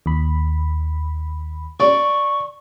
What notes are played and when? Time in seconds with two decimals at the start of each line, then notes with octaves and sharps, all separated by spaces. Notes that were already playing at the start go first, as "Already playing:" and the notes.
0.06 D#2 B5
1.80 D5 C#6